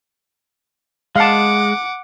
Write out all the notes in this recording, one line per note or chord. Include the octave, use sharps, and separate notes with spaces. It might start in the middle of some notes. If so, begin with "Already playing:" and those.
G#3 F5 F#5 A5 D6